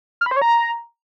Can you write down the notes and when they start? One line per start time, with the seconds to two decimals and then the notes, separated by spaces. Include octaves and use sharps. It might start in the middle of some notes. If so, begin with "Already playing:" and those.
0.21 F6
0.26 B5
0.31 C5
0.36 C#5
0.42 A#5